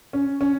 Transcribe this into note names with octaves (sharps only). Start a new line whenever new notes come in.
C#4
C#4